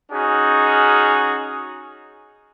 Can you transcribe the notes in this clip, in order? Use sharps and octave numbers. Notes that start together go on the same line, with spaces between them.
C#4 D#4 F#4 G#4